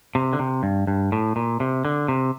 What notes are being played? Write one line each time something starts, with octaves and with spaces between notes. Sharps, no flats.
C3
D3
C3
G2
G2
A2
A#2
C3
D3
C3